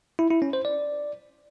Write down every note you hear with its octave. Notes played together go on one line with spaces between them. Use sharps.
E4
E4
C#4
C5
D5